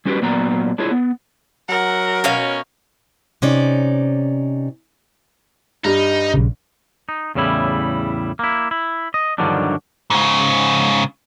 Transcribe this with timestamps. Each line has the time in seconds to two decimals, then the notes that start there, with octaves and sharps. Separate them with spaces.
0.05 G3 C#4 F#4 G4 A#4 B4
0.22 A#2 F#3 B3 D5 A#5
0.78 D4 E4 F4 G#4 C#5
0.91 B3
1.69 F#3 A#4 F#5
2.24 B2 C#4 C#5 F5
3.42 C3 C#4 D#4 D5
5.84 G2 G3 D#4
6.34 A#1 C#3
7.09 D#4
7.35 E2 A2 C#3 G3 E4
8.39 A#3 E4
8.71 E4
9.14 D#5
9.38 G2 D3 D#3 F3 F#3 D4
10.10 G#2 C#3